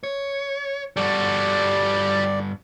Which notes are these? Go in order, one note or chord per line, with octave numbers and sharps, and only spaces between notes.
C#5
G2 G3 F#4 A4 D5